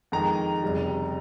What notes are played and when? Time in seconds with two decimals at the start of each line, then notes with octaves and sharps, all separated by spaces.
0.12 F2 D#3 G#3 A#5
0.63 F1 F2 C#3 G3